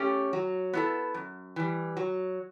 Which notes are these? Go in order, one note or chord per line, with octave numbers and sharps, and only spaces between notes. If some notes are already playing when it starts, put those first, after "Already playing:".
Already playing: A3 C#4 G4
F#3
B3 E4 A4
F#2
E3 G3
F#3